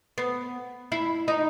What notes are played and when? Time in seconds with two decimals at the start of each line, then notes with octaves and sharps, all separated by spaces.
0.18 B3
0.92 E4
1.28 D#4